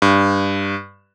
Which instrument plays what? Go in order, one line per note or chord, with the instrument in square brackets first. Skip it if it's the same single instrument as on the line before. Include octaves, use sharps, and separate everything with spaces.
[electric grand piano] G2